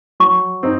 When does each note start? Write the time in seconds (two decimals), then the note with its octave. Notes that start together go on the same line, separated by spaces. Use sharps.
0.20 F#3 C#6
0.63 C4 D#4